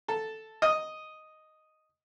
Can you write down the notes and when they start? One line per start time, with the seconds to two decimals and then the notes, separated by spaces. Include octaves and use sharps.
0.08 A4
0.62 D#5